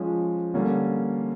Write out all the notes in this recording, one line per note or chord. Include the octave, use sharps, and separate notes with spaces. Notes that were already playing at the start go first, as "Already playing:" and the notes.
Already playing: F3 G#3 C#4
D3 G3 A#3 C#4